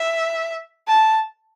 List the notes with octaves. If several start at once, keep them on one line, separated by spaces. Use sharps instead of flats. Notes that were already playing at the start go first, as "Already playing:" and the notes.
Already playing: E5
A5